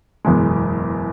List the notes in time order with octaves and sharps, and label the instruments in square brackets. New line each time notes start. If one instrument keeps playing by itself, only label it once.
[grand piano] F#1 E2 B2 G#3